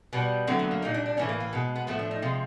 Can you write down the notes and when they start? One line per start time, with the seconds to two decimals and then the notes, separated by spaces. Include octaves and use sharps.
0.13 B2 G3 B3
0.47 D3 F#3 A3 C4
0.59 B3
0.71 A#3
0.82 A#2 G3 D#4
0.94 D4
1.06 D4
1.17 A2 E3 A3 C#4
1.29 A#3
1.40 A#3
1.53 B2 G#3
1.76 B3
1.87 A2 F3 A3 B3
1.99 D4
2.11 D#4
2.22 C3 F3 G#3 F4